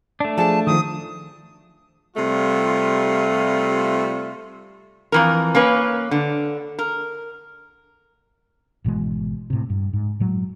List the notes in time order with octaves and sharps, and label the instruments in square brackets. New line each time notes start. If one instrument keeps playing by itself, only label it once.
[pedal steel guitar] A3 D4
[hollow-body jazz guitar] F3 G#4 [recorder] A5
[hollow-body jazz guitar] D#3 F3 [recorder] D#6
[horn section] C3 G3 A3 F4
[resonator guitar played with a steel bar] F2 E3 A#4
A#3 C#4 B4
D3
A#4
[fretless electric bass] G#1 B2 E3 G#3
A2 C3
G2
G#2
F#1 A2 F#3 G#3